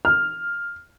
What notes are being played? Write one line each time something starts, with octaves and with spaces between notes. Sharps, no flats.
F6